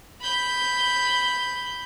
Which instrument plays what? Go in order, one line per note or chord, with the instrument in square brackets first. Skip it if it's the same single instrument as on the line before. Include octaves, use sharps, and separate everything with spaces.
[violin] B5 G6